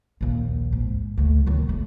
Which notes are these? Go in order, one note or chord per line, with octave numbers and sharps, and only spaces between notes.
A#1 D#2
G#2
D2 A3
D#3 F#3
A3